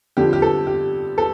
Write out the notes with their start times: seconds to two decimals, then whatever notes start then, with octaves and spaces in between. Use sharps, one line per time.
0.17 F2 D3 F3 G4
0.33 G4
0.42 A4
0.67 G4
1.18 A4